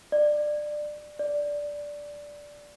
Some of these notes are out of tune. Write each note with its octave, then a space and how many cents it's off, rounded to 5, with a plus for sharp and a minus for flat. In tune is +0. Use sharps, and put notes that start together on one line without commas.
D5 +20
D5 -5